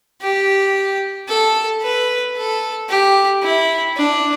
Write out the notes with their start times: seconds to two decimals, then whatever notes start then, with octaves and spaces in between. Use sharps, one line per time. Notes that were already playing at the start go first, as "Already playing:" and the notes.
0.22 G4
1.28 A4
1.82 B4
2.36 A4
2.89 G4
3.43 E4
3.97 D4